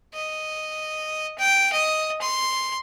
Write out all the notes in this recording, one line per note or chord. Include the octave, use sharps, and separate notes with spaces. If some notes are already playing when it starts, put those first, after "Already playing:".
D#5
G5
D#5
C6